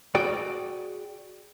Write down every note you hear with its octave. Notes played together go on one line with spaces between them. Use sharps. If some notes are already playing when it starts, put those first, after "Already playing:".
F#4 G#4 D5 G5